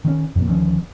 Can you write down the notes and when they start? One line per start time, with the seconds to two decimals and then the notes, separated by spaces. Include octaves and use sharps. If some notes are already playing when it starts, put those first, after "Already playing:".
0.05 D#3 C#4
0.36 F2 A#2
0.48 D2 D#3 F3 C#4